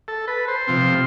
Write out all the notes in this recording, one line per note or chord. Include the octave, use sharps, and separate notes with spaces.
A4
B4
C5
C3 F3 C4